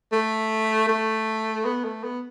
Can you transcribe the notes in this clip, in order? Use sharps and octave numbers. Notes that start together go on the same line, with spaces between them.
A3
A3
B3
A3
B3